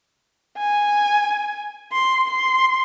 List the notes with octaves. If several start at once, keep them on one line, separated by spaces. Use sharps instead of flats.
G#5
C6
C6